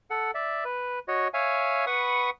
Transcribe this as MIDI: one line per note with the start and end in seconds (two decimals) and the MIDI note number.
0.10 0.31 69
0.10 0.31 78
0.35 0.64 74
0.35 0.64 76
0.65 0.99 71
1.08 1.28 66
1.08 1.28 73
1.08 1.28 75
1.34 1.85 73
1.34 1.85 76
1.34 1.85 77
1.34 1.85 80
1.87 2.30 71
1.87 2.30 78
1.87 2.30 83
1.87 2.30 85
1.87 2.30 87